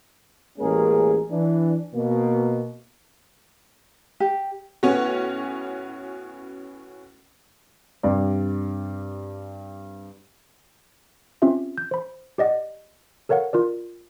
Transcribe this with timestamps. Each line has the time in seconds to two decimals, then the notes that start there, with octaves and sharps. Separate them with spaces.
0.59 A1 G#3 A#3 C#4 G#4 A#4
1.30 E3 D4
1.93 B2 A#3
4.20 G4
4.83 A2 B3 C#4 F#4
8.03 G2 C3 D5
11.42 C4 C#4 F4 G4 E5
11.78 G6
11.91 C5 B5
12.38 G4 D5 D#5 F#5
13.29 A4 A#4 C#5 F5 F#5
13.53 F4 A#4 D5